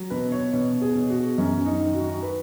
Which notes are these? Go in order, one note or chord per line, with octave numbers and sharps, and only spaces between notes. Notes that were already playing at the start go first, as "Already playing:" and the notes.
Already playing: F#3
B2 B4
C#5
B2 C#5
G#4
B2
F#4
F#2 C#4
D#4
D#3
F#4
B4